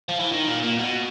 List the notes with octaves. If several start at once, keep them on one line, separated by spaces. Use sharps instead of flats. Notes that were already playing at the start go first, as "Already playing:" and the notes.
F3
E3
D#3
A#2
A#2
B2